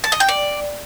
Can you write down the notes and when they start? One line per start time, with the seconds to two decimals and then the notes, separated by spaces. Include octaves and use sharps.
0.04 A5
0.12 D#5
0.20 G5
0.28 D5